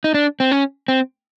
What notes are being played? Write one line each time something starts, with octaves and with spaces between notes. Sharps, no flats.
D#4
D4
C4
C#4
C4